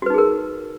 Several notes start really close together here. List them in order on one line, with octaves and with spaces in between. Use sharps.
F#4 B4 D#4 G#4 A#4